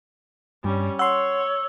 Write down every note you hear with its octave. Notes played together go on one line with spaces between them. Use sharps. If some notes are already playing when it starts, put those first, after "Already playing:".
G2 G3 C#4
C#5 F#5 C6 E6